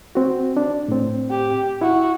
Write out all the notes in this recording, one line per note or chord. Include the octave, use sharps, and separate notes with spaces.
C4 F#4
D4
A2 C4
G4
E4 F#4